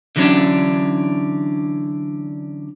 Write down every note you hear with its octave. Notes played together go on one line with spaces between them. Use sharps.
D3 E3 F#3 G3 C#4 D4